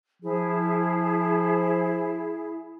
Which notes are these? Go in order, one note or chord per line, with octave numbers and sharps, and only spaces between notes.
F3 E4 G#4